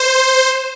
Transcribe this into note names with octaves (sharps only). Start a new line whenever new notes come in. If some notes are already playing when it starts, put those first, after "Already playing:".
Already playing: C5